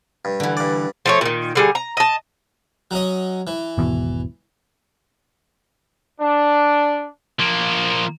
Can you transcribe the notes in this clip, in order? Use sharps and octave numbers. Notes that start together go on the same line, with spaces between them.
G2
D3 E3
G2 D5
F3 A3 C#5
A#2 D#3
D3 G3 G#4
A#5
D#5 A5
F#3 C#4 D#5
E3
G#1 E2 B2
D4
F3 A#3